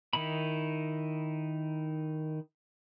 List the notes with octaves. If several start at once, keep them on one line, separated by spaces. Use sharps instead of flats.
D#3 D#4 E4 B5